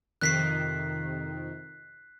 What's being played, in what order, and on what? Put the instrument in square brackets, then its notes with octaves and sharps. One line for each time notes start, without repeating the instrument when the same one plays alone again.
[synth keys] F2 C3 D#3 [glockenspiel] F#6 B6 C7